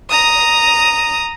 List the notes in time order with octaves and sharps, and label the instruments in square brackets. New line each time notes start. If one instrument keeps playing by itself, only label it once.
[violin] A#5 D#6